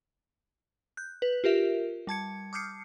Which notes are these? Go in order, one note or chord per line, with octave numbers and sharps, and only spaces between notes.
F#6 G6
B4
F4 G4 A#4 E5
G3 A5 G#6 C#7
D6 D#6 F6 G6 C7 C#7